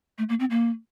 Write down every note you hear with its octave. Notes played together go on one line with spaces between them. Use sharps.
A3
A#3
C4
A#3